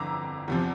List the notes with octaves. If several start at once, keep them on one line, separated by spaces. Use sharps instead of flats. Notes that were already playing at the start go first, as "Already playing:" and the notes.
Already playing: G1 F2 E3 D4 A#5 D6 E6
E2 C3 F3